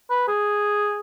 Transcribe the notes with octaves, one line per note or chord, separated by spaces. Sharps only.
B4
G#4